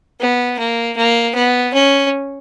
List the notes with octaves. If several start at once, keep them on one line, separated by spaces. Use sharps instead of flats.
B3
A#3
A#3
B3
C#4